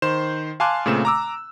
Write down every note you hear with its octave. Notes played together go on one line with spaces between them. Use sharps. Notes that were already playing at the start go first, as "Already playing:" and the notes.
D#3 C5 C6 E7
F5 G#5 A5 C6 D6 F#6
A#2 C#3 A3 C4 E7
A#5 D6 E6